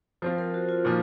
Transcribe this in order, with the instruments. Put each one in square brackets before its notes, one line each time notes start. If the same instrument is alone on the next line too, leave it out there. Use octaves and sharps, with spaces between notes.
[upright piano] F3 C4 F4 [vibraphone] C5
[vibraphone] A#4
F#4
F4
[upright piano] A#2 F3 [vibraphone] D#4